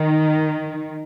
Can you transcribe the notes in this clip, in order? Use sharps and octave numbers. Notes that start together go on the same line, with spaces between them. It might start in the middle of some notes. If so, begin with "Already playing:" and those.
Already playing: D#3